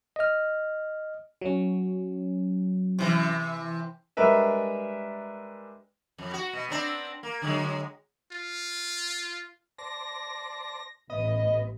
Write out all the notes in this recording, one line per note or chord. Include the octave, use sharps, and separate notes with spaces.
D#5 F6
F#3 C#4
C3 E3
G3 G#3 D4 A#4 B4 E5
F2
F#4
B2
B3 C4 D4
A#3
D3 F#3 G#3
F4
C5 D5 A5 A#6
A1 B3 D#5